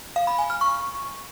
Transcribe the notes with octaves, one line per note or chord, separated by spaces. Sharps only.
F5
B5
G#5
F6
C#6